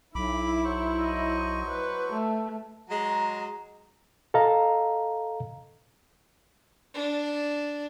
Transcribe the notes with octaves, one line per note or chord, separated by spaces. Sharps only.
B1 E4 B5 D6
F#3 C5 C#6
D#5
B4
A3
F#3 G#3 A#5
A4 D#5 F5 A#5
D4